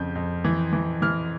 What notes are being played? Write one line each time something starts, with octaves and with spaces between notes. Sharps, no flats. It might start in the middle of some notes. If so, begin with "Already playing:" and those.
Already playing: F2 C#3 G6
F2
E3
E3
E3 F6